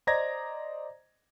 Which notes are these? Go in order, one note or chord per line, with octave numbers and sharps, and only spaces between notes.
C5 D5 D#5 A#5 G#6 A#6